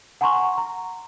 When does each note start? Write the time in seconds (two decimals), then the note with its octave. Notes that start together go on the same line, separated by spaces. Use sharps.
0.21 F#5 G#5 A#5 C6 C#6
0.58 A#5